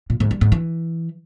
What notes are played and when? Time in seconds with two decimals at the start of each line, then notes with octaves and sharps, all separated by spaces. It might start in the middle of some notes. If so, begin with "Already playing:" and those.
0.10 A#2
0.20 G#2
0.31 G3
0.41 G#2
0.52 E3